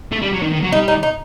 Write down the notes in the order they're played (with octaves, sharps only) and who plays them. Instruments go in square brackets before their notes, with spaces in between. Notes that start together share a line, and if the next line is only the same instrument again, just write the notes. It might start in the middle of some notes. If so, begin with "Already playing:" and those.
[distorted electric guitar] A3
G3
F#3
D#3
D#3
F#3
[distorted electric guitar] G3 [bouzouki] D#4
[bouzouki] D#4
D#4